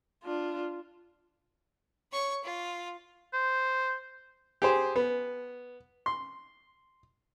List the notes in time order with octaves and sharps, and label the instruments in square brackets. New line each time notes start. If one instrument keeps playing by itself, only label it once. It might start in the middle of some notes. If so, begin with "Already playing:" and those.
[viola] D4 F4
[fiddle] C#5 C#6
F4
[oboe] C5
[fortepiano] G4 G#4 C5
B3
C6